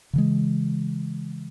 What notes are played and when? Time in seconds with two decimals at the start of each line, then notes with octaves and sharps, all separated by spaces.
0.13 C#3 E3 G#3